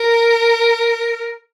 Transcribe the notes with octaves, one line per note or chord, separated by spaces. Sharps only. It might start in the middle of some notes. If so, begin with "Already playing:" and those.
Already playing: A#4